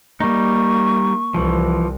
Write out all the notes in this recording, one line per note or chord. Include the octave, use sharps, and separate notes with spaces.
G3 A#3 D#4 C#6
C2 E3 F3